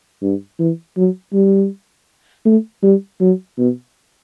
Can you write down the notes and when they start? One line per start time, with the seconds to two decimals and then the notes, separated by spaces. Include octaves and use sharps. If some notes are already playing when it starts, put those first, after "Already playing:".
0.22 G2
0.59 E3
0.97 F#3
1.33 G3
2.46 A3
2.83 G3
3.21 F#3
3.58 B2